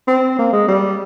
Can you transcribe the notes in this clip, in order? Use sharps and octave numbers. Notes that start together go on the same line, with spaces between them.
C4
A#3
G#3
G3